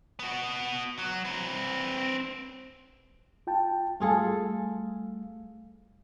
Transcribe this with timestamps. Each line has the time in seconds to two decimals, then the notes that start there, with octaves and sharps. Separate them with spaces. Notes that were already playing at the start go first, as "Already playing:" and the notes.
0.19 B3 F#4
0.99 F#3
1.25 C4 B4
3.47 F4 G5 A5
4.00 G3 A3 F4 G#4 A4 F5